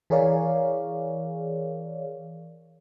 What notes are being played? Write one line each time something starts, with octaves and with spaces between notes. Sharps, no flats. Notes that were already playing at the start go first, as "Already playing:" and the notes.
E3 G#4 A#4 C#5 D5 F5